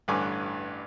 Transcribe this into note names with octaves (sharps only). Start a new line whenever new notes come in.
A1 G2 D3 B4 G#5 D6